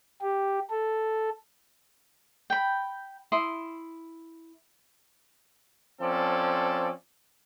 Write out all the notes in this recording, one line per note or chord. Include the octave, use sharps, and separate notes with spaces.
G4
A4
G5 B5
E4 C6 D#6
F3 C4 C#4 A4 D5